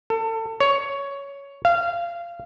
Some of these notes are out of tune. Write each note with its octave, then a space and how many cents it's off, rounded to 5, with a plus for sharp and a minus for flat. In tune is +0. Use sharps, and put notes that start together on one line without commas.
A4 +30
C#5 +10
F5 -20